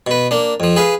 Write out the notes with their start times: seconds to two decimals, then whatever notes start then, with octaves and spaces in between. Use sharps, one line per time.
0.07 B2 B4
0.31 A#3 D4
0.60 F2 F3
0.76 G#4 B4 F5